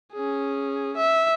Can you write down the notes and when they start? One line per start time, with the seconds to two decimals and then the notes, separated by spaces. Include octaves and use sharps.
0.13 C#4 G#4
0.97 E5